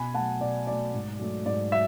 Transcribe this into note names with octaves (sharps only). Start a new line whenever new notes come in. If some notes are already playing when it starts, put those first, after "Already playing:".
Already playing: B2 G#5 B5
F#3 A3 F#5 A5
B2 D5
F#3 A3 D5
G#2
F#3 A3
G#2 D5
F#3 E5